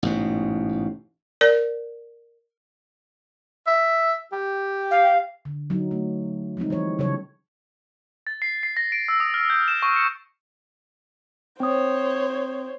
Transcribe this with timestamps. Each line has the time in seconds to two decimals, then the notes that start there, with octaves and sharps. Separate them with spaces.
0.03 A1 G#2 B2
1.41 A#4 D5
3.67 E5
4.32 G4
4.91 F5
5.45 D3
5.70 F#3 D#4
5.91 A3
6.57 F3 G#3 C4 D#4
6.70 E3 G3 C#5
6.99 C#3 E3 F#3 A4 C#5
8.27 A6
8.42 C7
8.63 C7
8.77 A#6
8.92 D7
9.08 E6
9.20 D#6
9.34 F6
9.50 G6
9.68 E7
9.83 C#6
9.96 C#7
11.60 C4 C5 C#5 D#6